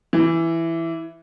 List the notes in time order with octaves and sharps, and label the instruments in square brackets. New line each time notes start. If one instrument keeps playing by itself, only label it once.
[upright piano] E3